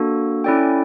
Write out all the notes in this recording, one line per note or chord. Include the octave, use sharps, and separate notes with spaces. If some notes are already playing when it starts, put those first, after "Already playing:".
Already playing: A#3 D4 F#4 A4
C#4 E4 A4 D5 G5